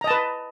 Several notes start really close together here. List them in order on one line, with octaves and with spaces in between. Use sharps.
A#5 D#5 A5 B4